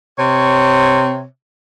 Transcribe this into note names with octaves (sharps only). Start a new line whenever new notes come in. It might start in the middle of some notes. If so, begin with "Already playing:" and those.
C3 C#5